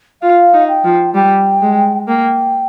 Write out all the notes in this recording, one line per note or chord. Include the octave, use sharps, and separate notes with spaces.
F4 F5
D#4
G5
F3
G3 G5
G#3
A#3 G5